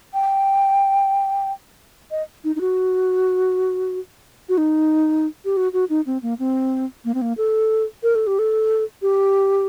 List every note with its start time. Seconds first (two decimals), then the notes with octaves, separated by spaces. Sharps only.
0.14 G5
2.11 D#5
2.44 D#4
2.56 D#4
2.61 F#4
4.49 F#4
4.58 D#4
5.45 G4
5.57 F#4
5.73 F#4
5.90 D#4
6.06 C4
6.23 A#3
6.39 C4
7.05 A#3
7.14 C4
7.22 A#3
7.38 A4
8.03 A#4
8.15 A4
8.27 G4
8.39 A4
9.02 G4